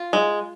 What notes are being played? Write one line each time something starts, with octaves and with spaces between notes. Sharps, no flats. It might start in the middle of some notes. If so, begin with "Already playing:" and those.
Already playing: F4
G#3